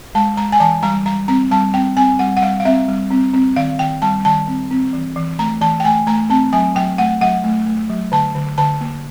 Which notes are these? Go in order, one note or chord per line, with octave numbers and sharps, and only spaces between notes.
G#3 A5
G#3 A#5
G#5
E3 A5
G3 A#5
G3 A#5
C4 A#5
G3 A5
C4 G5
C4 G#5
G3 F#5
F#5
G3 F5
F5
C4 E5
G3
C4
C4
D#3 F5
D#3 G5
G3 A5
D#3 A5
C4
C4
E3
E3
A3 A#5
E3 A5
G5
A3 G#5
A3 A#5
C4 A5
F#3 G#5
F#3 G5
A3 F#5
F#3 F#5
A3
A3
F#3
D3 A5
D3
D3 A5
A#3